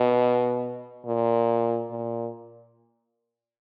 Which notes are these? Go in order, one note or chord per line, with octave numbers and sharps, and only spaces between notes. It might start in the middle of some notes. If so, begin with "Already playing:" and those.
Already playing: B2
A#2
A#2